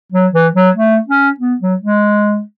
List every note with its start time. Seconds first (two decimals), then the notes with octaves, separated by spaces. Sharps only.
0.12 F#3
0.33 E3
0.55 F#3
0.75 A3
1.08 C#4
1.40 B3
1.60 F#3
1.81 G#3